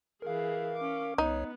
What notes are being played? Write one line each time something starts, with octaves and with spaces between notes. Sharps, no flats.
E3 G#4 A#4 F5
C#4 D6
C2 B3 D#4 C#5